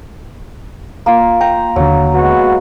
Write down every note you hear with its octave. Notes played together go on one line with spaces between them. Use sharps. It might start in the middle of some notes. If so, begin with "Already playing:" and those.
A#3 F4
G5 A#5
D#2 D3 F#3
G#3 B3 F#4